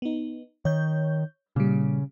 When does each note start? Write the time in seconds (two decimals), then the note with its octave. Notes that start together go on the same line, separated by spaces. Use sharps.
0.02 B3 D#4
0.65 D#3 C#5 G6
1.56 A#2 C#3 G3